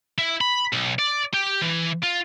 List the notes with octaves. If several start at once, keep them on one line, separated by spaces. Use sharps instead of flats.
E4
B5
B1
D5
G4
E3
F4